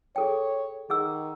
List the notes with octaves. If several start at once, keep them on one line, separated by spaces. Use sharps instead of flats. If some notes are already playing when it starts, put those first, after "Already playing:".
G#4 A4 C#5 G5
D#3 G#4 F#5 E6